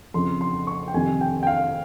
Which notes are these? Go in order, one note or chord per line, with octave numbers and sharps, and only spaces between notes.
F2 C#3 F3 C6
C6
C#6
G5
F2 C3 D#3 G#5
G5
G5
F5